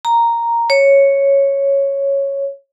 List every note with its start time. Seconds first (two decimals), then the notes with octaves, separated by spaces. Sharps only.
0.05 A#5
0.70 C#5